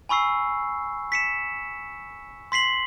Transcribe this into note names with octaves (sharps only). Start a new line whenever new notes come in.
G#5 B5 C#6 E6 C7
B6 C#7 E7
C6 B6 C7 F#7